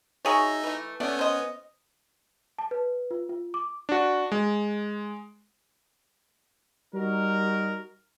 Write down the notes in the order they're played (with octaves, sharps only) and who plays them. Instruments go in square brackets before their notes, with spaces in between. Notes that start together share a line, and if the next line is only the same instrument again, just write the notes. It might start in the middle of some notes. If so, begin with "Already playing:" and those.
[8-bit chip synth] D#4 E5 A#5 [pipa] F#4 G#4 C#5
[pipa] E3 A3
[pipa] A3 D5 [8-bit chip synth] B3 C#4
[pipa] C5 D#5
[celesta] A5
B4
F4
F4
D6
[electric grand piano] D4 F#4
G#3
[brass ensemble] G3 D#4 F#4 A#4